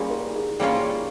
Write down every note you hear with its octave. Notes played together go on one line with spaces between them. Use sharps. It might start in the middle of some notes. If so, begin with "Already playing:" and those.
Already playing: G3 A#3 C#4 F4 G#4
A#4
G#4
G3 A#3 C#4 F4 G#4